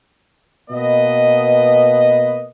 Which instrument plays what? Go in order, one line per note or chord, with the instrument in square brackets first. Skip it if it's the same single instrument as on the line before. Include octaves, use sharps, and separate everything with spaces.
[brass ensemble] B2 A#3 B4 D#5